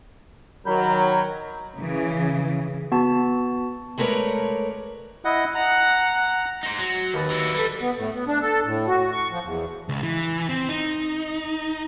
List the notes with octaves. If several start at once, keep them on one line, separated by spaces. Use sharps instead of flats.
D#3 F#3 A#4 B5 G6
C#3 E3
B3 F#4 A5
G#3 A3 A#4 B4 C#5 D5
E4 D#5 F#5
F#5 A#5
D#4 C5
F#3
D#2 B4 A5
F#3 E4
G3 A4 B4
B3
A2
B3
D4
A4
A2
F#4
C#6
F3
E2
C#2
E3
C4
D#4